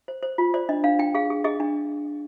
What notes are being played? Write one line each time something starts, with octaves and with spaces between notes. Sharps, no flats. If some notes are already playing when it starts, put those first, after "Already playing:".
C5
C5
F4
C5 D5
D4 D#5
D4 F5
D4 G5
G#4 F5
G#4
G#4 D#5
D4